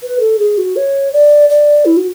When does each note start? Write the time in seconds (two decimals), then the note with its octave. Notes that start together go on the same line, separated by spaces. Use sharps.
0.03 B4
0.20 A4
0.39 G#4
0.58 F#4
0.76 C#5
1.13 D5
1.49 D5
1.85 E4
1.97 F#4